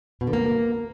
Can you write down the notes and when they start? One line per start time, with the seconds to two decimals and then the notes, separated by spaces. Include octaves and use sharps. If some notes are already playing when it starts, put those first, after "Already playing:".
0.21 B2
0.27 D3
0.33 A#3